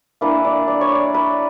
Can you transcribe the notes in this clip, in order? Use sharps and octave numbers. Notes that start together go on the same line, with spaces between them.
E3 A#3 D4 B4
D5
D5
C#5
D5
B4